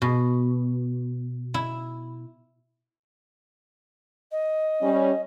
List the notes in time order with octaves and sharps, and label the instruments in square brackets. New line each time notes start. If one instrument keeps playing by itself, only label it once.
[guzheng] B2
E4
[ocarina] D#5
[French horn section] G3 C#4